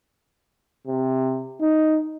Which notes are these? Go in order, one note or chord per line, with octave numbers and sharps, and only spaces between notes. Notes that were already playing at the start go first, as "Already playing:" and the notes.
C3
D#4